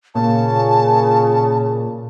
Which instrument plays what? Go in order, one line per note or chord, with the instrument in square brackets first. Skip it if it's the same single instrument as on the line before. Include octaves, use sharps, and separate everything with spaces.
[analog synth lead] A#2 [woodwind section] C#3 [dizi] A5